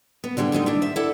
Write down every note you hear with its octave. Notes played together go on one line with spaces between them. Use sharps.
B3
D3 E3 G3 G#3
D3 G#3 A3 D#4
D#3 D4 E4
C5 E5
E4 A4 D5 F#5